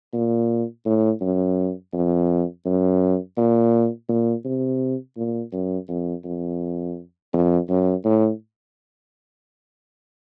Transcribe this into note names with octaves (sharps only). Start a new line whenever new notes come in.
A#2
A2
F#2
F2
F#2
A#2
A#2
C3
A#2
F#2
F2
F2
F2
F#2
A2